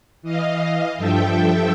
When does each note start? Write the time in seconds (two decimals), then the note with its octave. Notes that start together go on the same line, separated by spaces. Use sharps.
0.22 E3 D#5 F5
0.97 G2 F3 A4 E5 G5